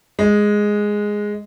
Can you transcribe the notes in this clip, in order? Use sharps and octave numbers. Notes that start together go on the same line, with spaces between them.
G#3